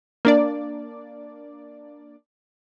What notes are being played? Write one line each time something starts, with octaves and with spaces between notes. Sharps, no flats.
A#3 D4 D5